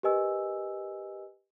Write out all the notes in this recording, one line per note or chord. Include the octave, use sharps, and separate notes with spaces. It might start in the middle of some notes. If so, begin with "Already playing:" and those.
G4 A#4 B4 D#5 G#5 E6